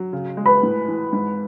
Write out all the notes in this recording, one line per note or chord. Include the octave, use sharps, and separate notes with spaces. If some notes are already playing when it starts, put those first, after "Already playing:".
Already playing: F#3
C#3
G#3
B4 B5
A2
E3
G#2